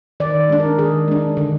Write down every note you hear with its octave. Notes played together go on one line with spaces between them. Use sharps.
D#3 D5
G#3 D4
A#4
D#3 G#4
G#3 D4
D3